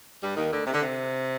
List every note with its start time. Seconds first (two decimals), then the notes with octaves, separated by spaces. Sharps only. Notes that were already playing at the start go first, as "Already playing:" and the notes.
0.22 G2 G3
0.36 D#2 D#3
0.51 D2 D3
0.66 C3
0.73 D3
0.80 C3